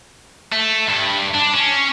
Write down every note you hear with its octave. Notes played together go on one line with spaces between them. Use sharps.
A3
G2
D4
C#4